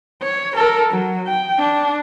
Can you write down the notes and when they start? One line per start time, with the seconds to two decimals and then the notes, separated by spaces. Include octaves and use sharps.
0.22 C#5
0.55 A4 A#4
0.90 F#3
1.27 G5
1.59 D4